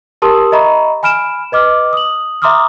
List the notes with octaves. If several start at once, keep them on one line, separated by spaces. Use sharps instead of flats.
G4 A#4 A5 C6 D#6 E6
D#5 E5 A#5 B5 C#6
G#5 B5 F6 D7 E7
B4 D#5 D6 F6
D#6 F#7
E5 A#5 C6 D6 D#6 F6